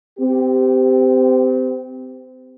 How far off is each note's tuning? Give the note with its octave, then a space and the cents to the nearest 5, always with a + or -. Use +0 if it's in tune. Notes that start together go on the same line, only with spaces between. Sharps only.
C4 -30 G4 +0